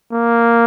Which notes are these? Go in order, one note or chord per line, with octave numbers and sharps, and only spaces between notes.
A#3